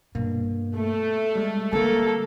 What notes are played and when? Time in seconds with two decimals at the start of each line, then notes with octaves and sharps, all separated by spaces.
0.15 G2 B2 A#3
0.76 A3
1.36 G3 G#3
1.73 D3 A#3 C4 A4